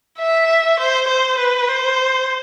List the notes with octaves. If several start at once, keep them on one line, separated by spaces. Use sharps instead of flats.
E5
C5
C5
B4
C5